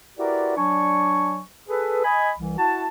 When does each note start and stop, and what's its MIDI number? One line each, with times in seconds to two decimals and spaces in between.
0.18 0.54 64
0.18 0.54 66
0.18 0.54 67
0.18 0.54 70
0.18 0.54 71
0.18 0.54 74
0.57 1.40 54
0.57 1.40 62
0.57 1.40 74
0.57 1.40 80
0.57 1.40 85
1.68 2.00 68
1.68 2.00 69
1.68 2.00 71
2.04 2.31 75
2.04 2.31 80
2.04 2.31 83
2.38 2.55 36
2.38 2.55 52
2.58 2.87 64
2.58 2.87 66
2.58 2.87 81